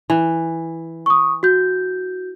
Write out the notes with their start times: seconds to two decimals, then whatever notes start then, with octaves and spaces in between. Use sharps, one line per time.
0.10 E3
1.06 C#6 D#6
1.43 F#4 G6